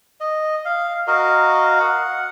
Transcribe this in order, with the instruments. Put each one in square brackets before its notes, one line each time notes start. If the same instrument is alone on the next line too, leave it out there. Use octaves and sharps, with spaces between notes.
[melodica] D#5
F5
F#4 A#4 D#5 F5
F#5